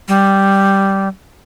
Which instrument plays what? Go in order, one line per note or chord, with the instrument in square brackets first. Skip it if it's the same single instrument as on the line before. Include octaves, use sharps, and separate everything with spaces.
[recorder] G3